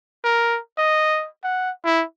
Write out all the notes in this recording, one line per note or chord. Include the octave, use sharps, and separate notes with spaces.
A#4
D#5
F#5
E4